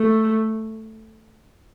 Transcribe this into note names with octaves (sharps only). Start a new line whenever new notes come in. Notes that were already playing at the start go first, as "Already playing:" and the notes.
Already playing: A3